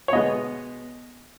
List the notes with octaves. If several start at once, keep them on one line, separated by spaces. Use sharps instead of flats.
C#5
B2 G#3 B3 D#5